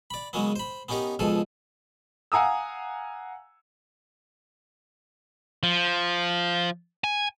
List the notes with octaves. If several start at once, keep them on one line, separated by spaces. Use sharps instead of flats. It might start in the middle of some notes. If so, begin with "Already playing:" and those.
D5 B5
C#3 F#3 G#3 A#3 B3
C5 B5
B3 C#4 D#4 G4 A#4
C#2 B2 F3 G#4 A4
F5 F#5 G#5 A#5 D#6 E6
F3
G#5